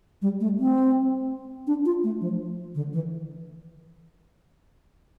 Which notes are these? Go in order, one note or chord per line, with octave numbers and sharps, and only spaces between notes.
G3
A3
C4
D4
F4
A3
F3
D3
E3